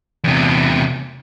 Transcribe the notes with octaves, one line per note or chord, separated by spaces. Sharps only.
E2 C3